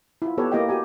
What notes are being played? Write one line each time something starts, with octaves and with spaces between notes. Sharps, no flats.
E4 F4
B3 G4 A4 B4 C#5
A#3 E4 G4 D#5 F5 G5
F#4 G4 G#5